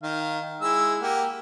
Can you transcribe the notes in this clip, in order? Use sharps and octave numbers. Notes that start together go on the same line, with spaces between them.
D#3 F5
G#3 E4 E6
A#3 G4 F#5